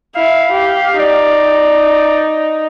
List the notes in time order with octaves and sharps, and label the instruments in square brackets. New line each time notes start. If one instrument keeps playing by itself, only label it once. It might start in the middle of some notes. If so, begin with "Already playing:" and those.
[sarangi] E4 [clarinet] F5
[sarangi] G4
[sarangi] D#4 [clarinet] D5